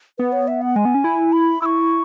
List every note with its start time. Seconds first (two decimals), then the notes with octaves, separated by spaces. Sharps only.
0.18 B3 B4
0.32 C#5
0.48 E5
0.62 F#5
0.76 G#3 G#5
0.85 B3
0.95 C#4
1.04 E4
1.33 B5
1.62 E4 C#6 E6